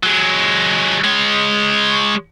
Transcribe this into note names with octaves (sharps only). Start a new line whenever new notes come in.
F#3 G#3
G#3 C#5